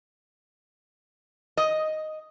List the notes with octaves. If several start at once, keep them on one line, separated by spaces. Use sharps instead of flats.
D#5